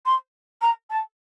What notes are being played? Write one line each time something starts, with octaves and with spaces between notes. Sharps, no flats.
C6
A#5
A5